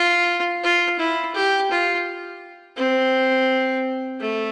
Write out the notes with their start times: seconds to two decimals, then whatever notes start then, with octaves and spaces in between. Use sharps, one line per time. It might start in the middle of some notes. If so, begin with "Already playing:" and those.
Already playing: F4
0.63 F4
0.99 E4
1.35 G4
1.71 F4
2.77 C4
4.21 A3